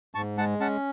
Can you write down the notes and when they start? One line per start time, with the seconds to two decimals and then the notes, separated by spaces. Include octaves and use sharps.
0.15 G#2 A5 C#6
0.37 G#3 F#5 A5
0.60 C#4 F#5 A5